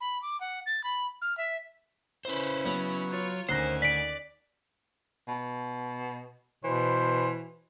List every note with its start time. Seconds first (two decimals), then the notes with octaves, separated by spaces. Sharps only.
0.01 B5
0.22 D6
0.41 F#5
0.66 A6
0.84 B5
1.22 F6
1.38 E5
2.25 C#3 C#4 E4 B4 C5
2.65 F#3 B3
3.09 F4 C#5
3.49 D2 D#3 C#4 C5 G#5 F#6 A#6 C7
3.82 D5 B6 D7
5.28 B2
6.64 B2 E3 C5